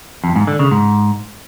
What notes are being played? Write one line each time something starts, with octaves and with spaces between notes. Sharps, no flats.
F2
G#2
D3
C#3
G#2